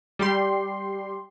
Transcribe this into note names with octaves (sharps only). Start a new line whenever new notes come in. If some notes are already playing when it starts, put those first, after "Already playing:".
G3 G4 C6